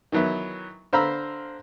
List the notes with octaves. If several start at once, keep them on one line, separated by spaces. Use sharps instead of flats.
D#3 E3 F#3 B3 E4
D3 C5 F5 A#5 B5 E6